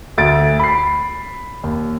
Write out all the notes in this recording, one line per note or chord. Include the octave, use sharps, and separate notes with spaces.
D2 A6 D7
B5 C7
D#2